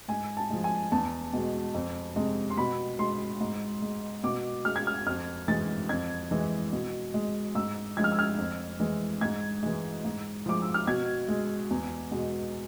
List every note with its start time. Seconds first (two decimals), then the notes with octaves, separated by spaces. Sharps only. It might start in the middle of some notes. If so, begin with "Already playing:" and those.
0.08 G#2 G#5
0.37 A5
0.50 F3 G#3
0.64 G#5
0.92 E2 A5
1.33 B2 G#3
1.74 F2
2.16 C3 G#3
2.50 C6
2.57 B2 B5
2.99 G#3 C6
3.41 G#2
3.82 G#3
4.24 B2 D6
4.65 G#3 F6
4.76 G#6
4.87 F6
5.06 F2 F6
5.48 E3 G#3 A6
5.89 F2 G#6
6.31 E3 G#3
6.73 B2
7.14 G#3
7.55 G#2 E6
7.97 F3 G#3 G#6
8.04 F6
8.12 E6
8.19 F6
8.38 F2
8.80 E3 G#3
9.21 G#2 G#6
9.63 E3 G#3
10.05 G#2
10.46 F3 G#3 D6
10.62 E6
10.74 F6
10.87 B2 G#6
11.28 G#3
11.71 E2
12.11 B2 G#3